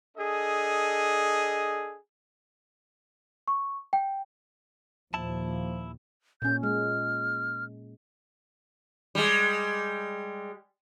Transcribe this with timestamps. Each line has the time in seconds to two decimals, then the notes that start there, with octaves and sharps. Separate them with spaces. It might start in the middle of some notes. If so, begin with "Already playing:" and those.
0.18 D4 G#4 A4 D#5
3.48 C#6
3.93 G5
5.14 D#2 A#2 F3 E4 A5
6.42 A#2 C#4 G6
6.63 G#3 F6
9.15 G3 G#3